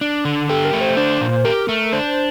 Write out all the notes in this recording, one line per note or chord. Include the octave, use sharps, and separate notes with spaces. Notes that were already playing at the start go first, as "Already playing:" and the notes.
D4
D3
G4 A4
A#4
A3
C5
D4 C5
A#2
G4 A#4
A3
D4 C5